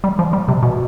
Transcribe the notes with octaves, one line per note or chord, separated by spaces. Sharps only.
G3
F3
G3
C3
B2